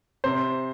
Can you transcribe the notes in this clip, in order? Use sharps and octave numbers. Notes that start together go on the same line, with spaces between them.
C3 C5